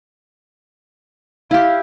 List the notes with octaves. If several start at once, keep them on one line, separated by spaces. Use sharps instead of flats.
E4 G4 F5